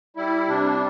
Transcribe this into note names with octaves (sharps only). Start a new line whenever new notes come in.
G3 E4
C3 D4